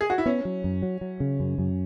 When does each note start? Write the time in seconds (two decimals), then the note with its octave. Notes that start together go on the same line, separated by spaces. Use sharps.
0.01 G#4
0.10 F#4
0.18 E4
0.26 B3 C#4
0.45 F#3
0.64 F#2
0.82 F#3
1.01 F#3
1.20 C#3
1.40 F#2
1.58 F#2